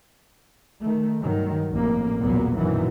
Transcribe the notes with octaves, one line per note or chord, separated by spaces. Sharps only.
D#3 A3
G2 D#3 F#3
A1 F2 A2 A#3
B1 E2 A#2 F#3 A#3 B3
F#2 A#2 D#3 E3 F#3